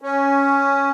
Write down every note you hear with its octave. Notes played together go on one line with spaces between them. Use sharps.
C#4